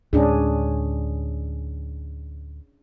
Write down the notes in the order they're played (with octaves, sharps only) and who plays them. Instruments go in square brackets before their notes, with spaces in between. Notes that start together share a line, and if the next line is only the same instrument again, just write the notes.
[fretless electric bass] D2 A2 G#3 [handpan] C#4 D4 G#4